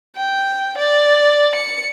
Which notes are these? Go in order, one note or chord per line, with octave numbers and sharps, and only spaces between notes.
G5
D5
C#7